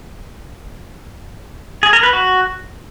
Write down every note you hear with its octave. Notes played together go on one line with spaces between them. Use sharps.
G#4
A#4
B4
F#4